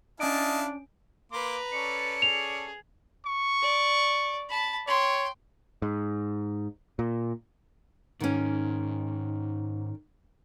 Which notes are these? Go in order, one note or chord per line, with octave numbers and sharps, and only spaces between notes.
C#4 D4 E4 D#5 F5 A5 D7
A#3 B4 A#5 C6 D6
C#4 A4 D5 C#7
G#4 F7
C#6
D5
A5 B5
C#5 G5 C6
G#2
A#2
G#2 D#3 C#4